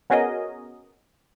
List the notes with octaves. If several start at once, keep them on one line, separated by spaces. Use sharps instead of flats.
B3 C#4 F#4 G#4 A#4 D#5